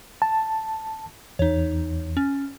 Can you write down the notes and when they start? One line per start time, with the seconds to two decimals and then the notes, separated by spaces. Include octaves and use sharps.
0.22 A5
1.39 E2 D#4 C#5
2.17 C#4